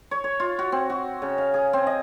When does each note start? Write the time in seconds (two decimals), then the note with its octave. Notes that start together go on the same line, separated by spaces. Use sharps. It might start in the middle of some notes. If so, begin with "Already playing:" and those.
0.11 C#5
0.24 C#5
0.40 F4
0.59 F#4
0.72 C4
0.90 F#4
1.22 C#3
1.38 F5
1.54 G#4
1.73 C4
1.87 D#5